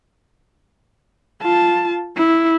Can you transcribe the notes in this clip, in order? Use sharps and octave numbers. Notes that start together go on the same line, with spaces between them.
F4 A5
E4